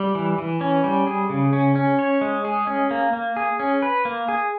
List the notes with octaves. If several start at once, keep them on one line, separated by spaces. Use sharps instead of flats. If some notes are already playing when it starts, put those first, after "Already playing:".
Already playing: G3
E3
E3
C#4
G3
G#4
C#3
C#4
C#4
C#5
G#3
G#4
C#4
A#3
A#3
G#4
C#4
B4
A#3
G#4